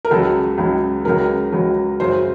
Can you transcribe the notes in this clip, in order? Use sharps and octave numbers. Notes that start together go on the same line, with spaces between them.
A#4
C#2 C#3 F#3 A4
C#2 C#3 F#3
C#2 C#3 F#3 A#4
C#2 C#3 F#3
F#2 C#3 F#3 C5